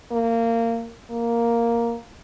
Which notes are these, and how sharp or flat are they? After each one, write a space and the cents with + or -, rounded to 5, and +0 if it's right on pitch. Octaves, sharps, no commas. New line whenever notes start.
A#3 -20
A#3 +0